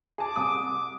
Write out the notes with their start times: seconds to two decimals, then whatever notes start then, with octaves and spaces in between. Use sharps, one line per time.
0.18 G#4 A5 D6
0.36 C2 D#6